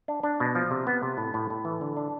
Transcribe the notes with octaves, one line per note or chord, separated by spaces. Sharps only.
D4
D4
B2
F3
C3
B3
C3
A2
A2
A2
E3
D3
D4